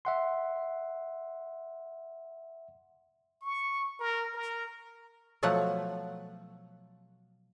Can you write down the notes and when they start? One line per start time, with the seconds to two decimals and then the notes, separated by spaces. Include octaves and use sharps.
0.05 E5 F#5 C6
3.42 C#6
4.00 A#4
4.34 A#4
5.43 B2 F3 F#3 A3 F#5